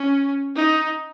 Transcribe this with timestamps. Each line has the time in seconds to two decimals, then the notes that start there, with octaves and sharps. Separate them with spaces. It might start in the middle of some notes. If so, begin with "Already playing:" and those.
Already playing: C#4
0.56 D#4